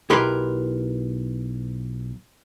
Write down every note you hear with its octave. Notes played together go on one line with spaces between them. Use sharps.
B1 E4 G4 A#4 B4 C6